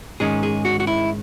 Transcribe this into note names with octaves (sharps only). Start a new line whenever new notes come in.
G#2 D#3 G#3 C#4 G#4
G#4
F#4
F#4
E4